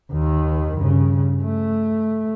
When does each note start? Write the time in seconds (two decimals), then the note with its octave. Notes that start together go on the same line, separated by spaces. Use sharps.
0.12 D#2 D#3
0.76 G2 C#3
1.43 A3